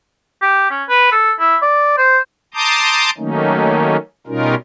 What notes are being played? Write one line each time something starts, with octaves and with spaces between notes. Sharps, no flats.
G4
C#4
B4
A4
E4
D5
C5
A5 A#5 C6 D6 D#6 G6
D#3 F#3 A3 A#3 C#4 D#4
B2 G3 C#4 D#4 F4 A#4